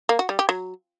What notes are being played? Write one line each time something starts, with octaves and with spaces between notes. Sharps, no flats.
A#3
F#4
G3
G4
F#3